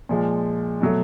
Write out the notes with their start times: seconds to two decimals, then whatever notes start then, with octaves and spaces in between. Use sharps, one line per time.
0.09 A#2 F3 G#3
0.81 B2 F#3 A3